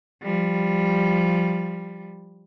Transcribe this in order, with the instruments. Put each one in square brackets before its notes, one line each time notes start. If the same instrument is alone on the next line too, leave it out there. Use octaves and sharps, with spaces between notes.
[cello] F3 G3